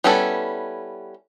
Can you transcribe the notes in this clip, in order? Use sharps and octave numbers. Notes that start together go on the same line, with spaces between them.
G3 B3 C#4 E4 A4